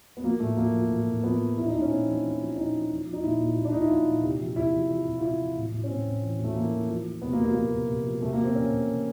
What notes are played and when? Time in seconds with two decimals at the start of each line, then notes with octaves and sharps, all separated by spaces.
0.17 B3
0.24 F3 A#3
0.40 A2 A3
0.57 F3 A#3
0.74 F3
0.90 A2
1.07 A2
1.23 F3 B3
1.40 F3
1.57 A#2 E4
1.66 D#4
1.74 A#2 D4
1.82 C#4
1.90 A#2 C4
2.06 F3
2.23 F3
2.40 F3
2.50 E4
2.56 A#2 D#4
2.74 F3
2.90 F3
3.06 F3
3.13 D#4
3.23 A#2 E4
3.39 A#2
3.56 A#2
3.65 D4
3.73 A#2 D#4
3.82 E4
3.89 F3 F4
4.06 A#2
4.23 C3
4.39 F3
4.56 C3 E4
4.72 F3
4.89 F3
5.06 C3
5.18 F4
5.22 C3 E4
5.39 F3
5.55 A2
5.72 A2
5.84 C#4
5.89 A2 C4
6.05 A2
6.22 E3
6.39 A2 A3
6.55 E3 A#3
6.71 E3
6.88 F3
7.05 F3
7.22 C3 B3
7.33 A#3
7.39 C3
7.44 A#3
7.54 F3 A#3
7.72 C3
7.89 C3
8.05 F3
8.21 C3 A3
8.33 A#3
8.38 F3
8.44 C4
8.55 F3 C#4
8.71 C3
8.88 C3